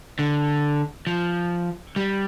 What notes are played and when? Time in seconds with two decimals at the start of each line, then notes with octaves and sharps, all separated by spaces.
0.19 D3
1.07 F3
1.96 G3